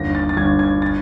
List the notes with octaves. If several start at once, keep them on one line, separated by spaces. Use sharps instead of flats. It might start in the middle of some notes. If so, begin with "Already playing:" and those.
Already playing: G1 D#2 A#6
A6
A6
G1 G#6
G#6
A6